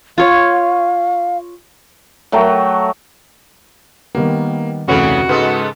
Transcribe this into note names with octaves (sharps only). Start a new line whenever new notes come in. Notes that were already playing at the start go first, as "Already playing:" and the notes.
F4 C#5 F5
F#3 A3 G5 A#5
D#3 G3 A#3 B3
F1 D2 C#3 E3 B3 C#4 F#4 F#5
G#2 C#3 G#3 B3 A4 B4 F6